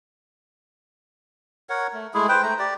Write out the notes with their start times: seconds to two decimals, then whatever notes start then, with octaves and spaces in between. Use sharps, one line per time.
1.69 A#4 C#5 F#5
1.93 A3
2.14 G#3 A3 E4 G#4
2.29 B4 C5 G5
2.43 A3 A#5
2.59 G4 D5